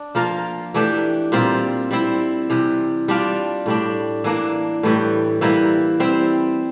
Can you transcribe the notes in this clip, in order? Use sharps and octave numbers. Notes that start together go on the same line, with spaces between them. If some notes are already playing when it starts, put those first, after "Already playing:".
Already playing: D4
F3 A#3 F4 A#4
E3 A3 D4 G4
A#2 G3 C4 F4
G3 C4 E4
C3 E3 G3
G3 D4 F4
A2 G3 D4
E3 A#3 D4
A2 E3 G3
E3 G3 A#3 E4
G3 C4 E4